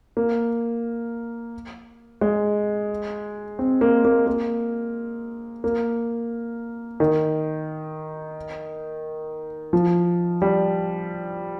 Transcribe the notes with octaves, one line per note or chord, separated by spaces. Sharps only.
A#3
G#3
C4
A#3
A#3
A#3
A#3
D#3
F3
G3